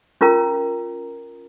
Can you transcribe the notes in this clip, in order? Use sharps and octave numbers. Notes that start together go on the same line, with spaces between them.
C#4 F4 A#4 A#5